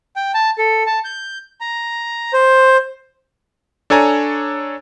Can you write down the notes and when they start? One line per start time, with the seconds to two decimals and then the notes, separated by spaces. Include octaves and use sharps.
0.16 G5
0.34 A5
0.58 A4
0.86 A5
1.04 G6
1.61 A#5
2.33 C5
3.90 D4 A4 C#5 G#5 A#5